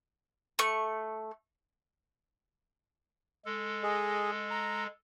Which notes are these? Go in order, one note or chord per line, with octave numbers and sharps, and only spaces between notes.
A3 C#6
G#3 A4
G#4 D#5
A#5